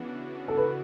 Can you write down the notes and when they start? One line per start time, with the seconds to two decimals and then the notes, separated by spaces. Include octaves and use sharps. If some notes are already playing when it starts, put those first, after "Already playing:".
Already playing: C#3 E3 B3 D4 F#4
0.48 A4
0.57 B4